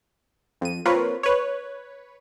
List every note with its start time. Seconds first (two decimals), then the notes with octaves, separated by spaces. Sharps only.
0.61 F2 D#7
0.85 A#3 C4 F4 A#4 B4 C#5
1.23 B4 C#5